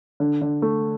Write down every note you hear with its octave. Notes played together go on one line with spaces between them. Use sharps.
D3
D3
A3